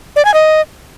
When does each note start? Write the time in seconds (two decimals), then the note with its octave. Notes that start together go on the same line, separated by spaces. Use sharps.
0.16 D5
0.25 G#5
0.34 D#5